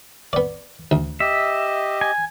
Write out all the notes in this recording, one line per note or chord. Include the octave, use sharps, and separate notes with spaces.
B3 D5
D2
G4 D#5 E5
G#5